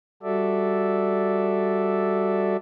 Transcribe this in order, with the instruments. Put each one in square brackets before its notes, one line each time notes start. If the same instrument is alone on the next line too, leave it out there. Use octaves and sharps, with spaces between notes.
[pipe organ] G3 F#4 A4 D5 E5